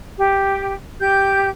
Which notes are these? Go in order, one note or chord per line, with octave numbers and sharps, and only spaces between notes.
G4
G4 G6